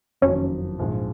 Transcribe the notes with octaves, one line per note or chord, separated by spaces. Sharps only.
F#1 F2 D#3 F#3 C#4
A#1 G#2 F3 G#3